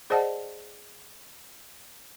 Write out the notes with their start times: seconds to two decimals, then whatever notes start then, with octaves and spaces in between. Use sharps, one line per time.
0.10 G#4 C5 D5 D#5 F#5 A5